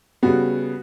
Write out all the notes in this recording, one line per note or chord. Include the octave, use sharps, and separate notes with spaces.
C#3 G3 B3 F#4